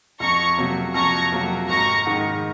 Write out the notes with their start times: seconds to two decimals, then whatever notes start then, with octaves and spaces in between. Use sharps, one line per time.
0.20 F2 A#5 C#6
0.58 C3 F#3 A#3
0.94 F2 A#5 C#6
1.32 C3 F#3 A#3
1.68 G#1 A#5 C#6
2.06 G#2 D#3